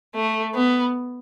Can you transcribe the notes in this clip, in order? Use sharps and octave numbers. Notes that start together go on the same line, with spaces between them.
A3
B3